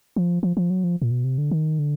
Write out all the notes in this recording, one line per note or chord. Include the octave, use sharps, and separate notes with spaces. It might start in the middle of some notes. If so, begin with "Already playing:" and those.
F3
F3
F3
F#3
F3
A#2
B2
C3
D3
D#3
D3